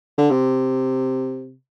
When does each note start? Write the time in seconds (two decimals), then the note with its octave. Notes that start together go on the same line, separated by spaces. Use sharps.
0.18 D3
0.30 C3